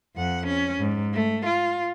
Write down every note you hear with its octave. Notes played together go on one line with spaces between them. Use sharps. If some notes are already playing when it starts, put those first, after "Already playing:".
F2 F#5
C#4
G#2
A3
F4